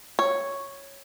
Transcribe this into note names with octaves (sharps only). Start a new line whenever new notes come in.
C#5